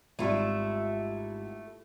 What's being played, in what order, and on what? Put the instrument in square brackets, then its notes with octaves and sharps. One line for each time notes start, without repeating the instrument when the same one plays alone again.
[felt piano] G#1 G3 [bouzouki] A3 E4 [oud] F4